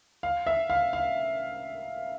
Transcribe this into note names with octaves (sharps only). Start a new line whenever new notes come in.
F5
E5
F5
F5